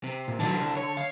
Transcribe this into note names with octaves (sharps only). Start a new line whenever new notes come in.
C3
A#2
D3 D#3 F#3 A5
C2
C#5
F5